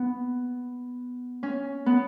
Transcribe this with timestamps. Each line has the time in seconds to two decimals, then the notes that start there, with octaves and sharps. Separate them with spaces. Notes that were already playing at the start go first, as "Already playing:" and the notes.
Already playing: B3
1.43 C#4
1.86 B3